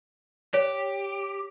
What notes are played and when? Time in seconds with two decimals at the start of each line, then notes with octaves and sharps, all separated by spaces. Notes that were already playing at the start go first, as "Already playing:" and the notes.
0.54 G4 C#5